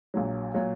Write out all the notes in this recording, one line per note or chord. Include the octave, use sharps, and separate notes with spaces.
A#1 A#2 F#3
A#2 F#3 C#5